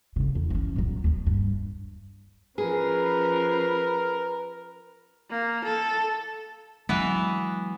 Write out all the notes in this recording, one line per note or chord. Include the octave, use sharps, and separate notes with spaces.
D2 C#3
E2
E3 C#4
A#2 F#3
D#2 F3
G2
F3 C#4 G#4 A#4 B4
A#3
A4
E3 F#3 G#3 B3